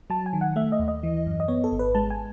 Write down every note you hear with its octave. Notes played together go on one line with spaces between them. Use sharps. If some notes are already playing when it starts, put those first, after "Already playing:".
F#3 A5
G#5
D#3
F#5
A3 E5
D#5
D#2
D#5
E3
F#2
D#5
B3 C#5
A4
G#1
B4
G#3 A5
G#5